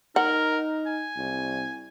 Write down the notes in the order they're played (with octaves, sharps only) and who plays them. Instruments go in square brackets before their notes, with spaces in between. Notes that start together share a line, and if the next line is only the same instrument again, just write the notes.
[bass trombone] D#4 [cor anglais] A#4 [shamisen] F#5
[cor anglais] G#5
[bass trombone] C2